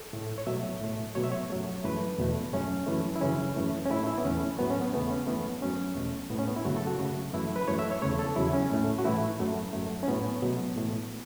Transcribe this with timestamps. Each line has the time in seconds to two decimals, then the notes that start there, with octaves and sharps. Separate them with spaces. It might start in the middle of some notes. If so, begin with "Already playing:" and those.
Already playing: A4
0.13 A2 A3
0.38 C#5
0.47 B2 F#3 A3 E5
0.81 A2 A3
1.15 B2 F#3 A3 C#5
1.24 E5
1.32 C#5
1.50 F#2 F#3 A3
1.84 F#2 E3 A3 B4
2.18 E2 B2 A3
2.53 F#2 F#3 A3 C#4
2.87 F#2 E3 A3
3.16 E4
3.21 F#2 C#3 E3 C#4
3.56 F#2 E3 A3
3.86 C#4
3.90 A2 A3 E4
4.07 E4
4.18 B3
4.24 E2 E3 A3 C#4
4.59 A2 F#3 A3 B3
4.70 C#4
4.82 B3
4.93 E2 C#3 E3 A3 B3
5.10 C#4
5.27 F#2 E3 A3 B3
5.62 F#2 F#3 A3 C#4
5.96 E2 B2 A3
6.30 A2 B3
6.35 A3 C#4
6.47 B3
6.57 E4
6.65 F#2 C#3 A3 F#4
6.77 A4
6.87 F#4
6.99 F#2 C#3 A3
7.33 F#2 E3 A3 E4
7.56 B4
7.68 F#2 E3 A3 C#5
7.79 E5
7.91 C#5
8.01 E2 C#3 A3 C#5
8.19 A4
8.36 E2 C#3 F#3 E4
8.53 C#4
8.71 A2 A3
8.99 F#4
9.04 A2 E3 A3 E4
9.39 F#2 F#3 A3
9.73 F#2 F#3 A3
10.03 C#4
10.08 A2 F#3 A3 B3
10.42 B2 F#3 A3
10.76 A2 E3 A3